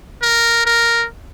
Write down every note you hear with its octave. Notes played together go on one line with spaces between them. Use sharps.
A#4
A#4